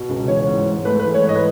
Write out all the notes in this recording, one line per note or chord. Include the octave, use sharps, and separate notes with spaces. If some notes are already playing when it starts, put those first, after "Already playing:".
Already playing: B2
C#2
E3 C#5
G#2
G#2
A3 B4
E3 B4
C#5
G#2
D#5
B4